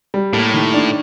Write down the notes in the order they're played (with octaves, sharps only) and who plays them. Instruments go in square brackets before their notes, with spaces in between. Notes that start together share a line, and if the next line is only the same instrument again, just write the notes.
[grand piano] G3
[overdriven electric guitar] A2 [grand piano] A#3
[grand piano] D#3
D4